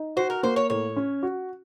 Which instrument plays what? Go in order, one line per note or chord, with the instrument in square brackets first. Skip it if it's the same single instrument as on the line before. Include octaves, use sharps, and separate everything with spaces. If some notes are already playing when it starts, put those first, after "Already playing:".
Already playing: [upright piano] D#4
[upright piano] F#4 [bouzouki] C5
[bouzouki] A#4
[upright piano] A#3 [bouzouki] C5
[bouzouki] C#5
[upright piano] A2 [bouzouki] C#5
[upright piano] C#4
F#4